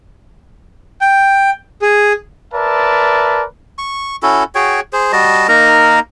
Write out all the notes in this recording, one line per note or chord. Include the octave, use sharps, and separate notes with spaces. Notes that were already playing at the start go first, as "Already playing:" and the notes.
G5
G#4
A#4 B4 D5 E5 A5
C#6
C#4 E4 F#4 A4
F#4 G#4 C#5 G5
G#4 C5
G3 F#4 D#5 A5
A#3 D#4 A#4 A#5